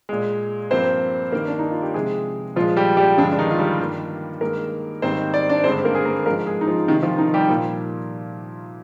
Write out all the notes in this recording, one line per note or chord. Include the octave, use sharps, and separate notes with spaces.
A#2 G#3
G2 F3 A#3 C4 C5
G2 D#3 A#3 A#4
D4
D#4
F4
G4
C3 F3 G#3 G#4
A#2 F3 G#3 F4
G3 G4
G3 G4
G2 D3 F3 G#3 D4
D4
D#3 D#4
F4
G3 G4
G2 D#3 A#3
G2 D#3 G#3 A#3 A#4
G#2 D#3 G3 A#3 C4 C5
D5
D4 D5
G2 D3 G#3 C4 C5
A#3 A#4
G#4
A#3 A#4
G#2 F3 G#3 A#3 A#4
G#3 G#4
D#4
F3 F4
C3 D#3 G3 A#3 D#4
F3 F4
D#3 D#4
G3 G4
A#2 F3 A#3